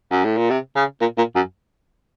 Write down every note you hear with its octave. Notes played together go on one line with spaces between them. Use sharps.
F#2
A2
A#2
C3
C#3
A#2
A#2
F#2